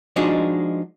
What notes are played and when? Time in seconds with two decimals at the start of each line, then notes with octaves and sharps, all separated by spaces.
0.16 F3 G#3 D4 D#4 F#4